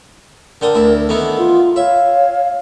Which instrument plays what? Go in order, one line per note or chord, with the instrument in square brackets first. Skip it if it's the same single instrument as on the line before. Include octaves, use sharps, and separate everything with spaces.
[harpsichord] D3 G5 D#6 [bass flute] A#4
[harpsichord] D2 E4
[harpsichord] D#3 E3 B3 [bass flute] A4
[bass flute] F4
[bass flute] C#5 [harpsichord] E5 [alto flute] F5